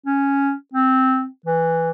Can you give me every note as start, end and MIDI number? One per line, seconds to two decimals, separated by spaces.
0.06 0.52 61
0.74 1.25 60
1.46 1.90 52